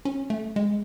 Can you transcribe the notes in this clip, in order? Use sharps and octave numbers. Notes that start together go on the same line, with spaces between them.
C#4
A3
G#3